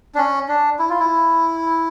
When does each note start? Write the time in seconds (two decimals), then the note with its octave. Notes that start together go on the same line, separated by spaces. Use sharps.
0.15 D4
0.18 C#4
0.49 D4
0.79 E4
0.90 F4
1.00 E4